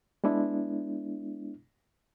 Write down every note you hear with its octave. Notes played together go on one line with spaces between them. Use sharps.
G#3 B3 D4 E4